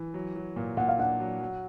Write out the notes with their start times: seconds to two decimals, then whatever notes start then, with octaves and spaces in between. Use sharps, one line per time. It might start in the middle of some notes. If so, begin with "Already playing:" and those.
Already playing: E3
0.14 F#3
0.36 F#3
0.56 A#2
0.77 A#2 F#5
0.88 F5
0.98 D4 F#5
1.20 F#3
1.40 F#3